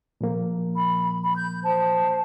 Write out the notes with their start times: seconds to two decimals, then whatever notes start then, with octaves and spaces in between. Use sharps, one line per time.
0.21 A#2 F3 A#3
0.76 B5
1.23 B5
1.36 G6
1.64 C5 A5